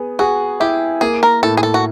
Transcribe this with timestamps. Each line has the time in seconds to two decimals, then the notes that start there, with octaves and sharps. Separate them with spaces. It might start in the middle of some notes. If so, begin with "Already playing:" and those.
Already playing: B3 G#4
0.19 F#4 G#4
0.60 E4 G4
1.01 A#3 G#4
1.23 A#4
1.43 A2 A4
1.57 G#4
1.63 A4
1.74 F#4